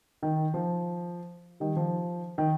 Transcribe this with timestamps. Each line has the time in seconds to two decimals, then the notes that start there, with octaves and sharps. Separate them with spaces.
0.23 D#3
0.54 F3
1.60 D#3 G3
1.76 F3
2.38 D#3